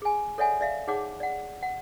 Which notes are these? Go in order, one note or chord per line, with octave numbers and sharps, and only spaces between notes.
G#4 G#5
A4 C#5 D5 E5 F#5 G#5
D5 E5 F5
D#4 G#4 C#5 F#5 D6
D5 F#5
F#5